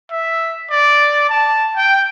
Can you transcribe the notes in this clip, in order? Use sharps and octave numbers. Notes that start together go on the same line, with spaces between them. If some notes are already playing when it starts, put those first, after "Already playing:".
E5
D5
A5
G5